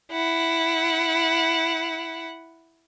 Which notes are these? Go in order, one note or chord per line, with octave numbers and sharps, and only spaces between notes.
E4 F#5